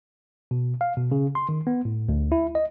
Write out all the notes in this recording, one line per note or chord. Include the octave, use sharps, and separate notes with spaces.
B2
F5
B2
C#3
C6
D#3
B3
A2
D2
E4
D#5